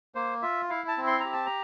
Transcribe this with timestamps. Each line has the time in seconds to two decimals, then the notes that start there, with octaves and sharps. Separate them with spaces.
0.15 A#3 C5
0.42 F4 E5
0.70 E4 F5
0.88 A5
0.97 C4
1.07 C6
1.20 G4 A#5
1.33 A5
1.46 A#5